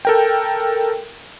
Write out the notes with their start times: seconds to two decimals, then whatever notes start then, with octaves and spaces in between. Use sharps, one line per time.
0.05 A4 A#4 G5